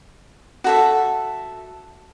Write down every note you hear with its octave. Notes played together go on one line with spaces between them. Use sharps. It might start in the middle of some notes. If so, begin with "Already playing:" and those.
F#4 A4 E5